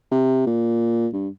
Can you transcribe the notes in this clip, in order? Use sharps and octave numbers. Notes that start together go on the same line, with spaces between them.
C3
A#2
G2